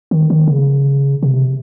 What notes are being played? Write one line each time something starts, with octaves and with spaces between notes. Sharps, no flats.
D#3
D#3
C#3
C3